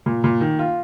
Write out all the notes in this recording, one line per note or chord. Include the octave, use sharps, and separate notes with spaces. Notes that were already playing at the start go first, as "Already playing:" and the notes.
A#2
A#2
D#3
F4